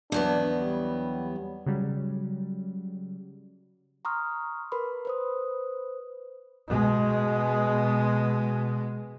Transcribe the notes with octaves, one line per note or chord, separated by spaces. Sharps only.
E2 F#3 B3 D4
G3
C#3 F#3 G3
A#5 C6 C#6 D#6 F6
A#4 B4 B5 C6
B4 C5 D#6
B2 G#3